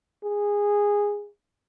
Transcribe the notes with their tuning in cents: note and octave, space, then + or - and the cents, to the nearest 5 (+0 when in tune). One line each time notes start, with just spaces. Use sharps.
G#4 -15